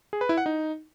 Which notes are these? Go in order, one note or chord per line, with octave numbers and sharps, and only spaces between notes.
G#4
B4
E4
F#5
D#4